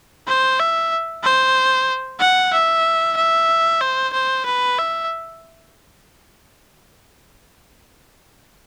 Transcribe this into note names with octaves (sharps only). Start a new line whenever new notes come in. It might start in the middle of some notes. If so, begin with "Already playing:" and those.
C5
E5
C5
F#5
E5
E5
C5
C5
B4
E5